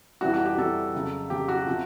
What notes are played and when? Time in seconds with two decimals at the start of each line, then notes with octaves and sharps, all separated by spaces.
0.21 F2 C3 E3 G3 F#4
0.34 F#4
0.45 G4
0.58 F2 C3 E3 G3 A4
0.95 F2 C#3 F#3
1.30 F2 C#3 F#3 G4
1.49 F#4
1.67 C3 F3